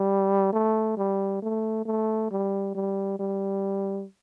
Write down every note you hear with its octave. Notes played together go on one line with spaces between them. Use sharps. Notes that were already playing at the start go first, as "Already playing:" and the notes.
Already playing: G3
A3
G3
A3
A3
G3
G3
G3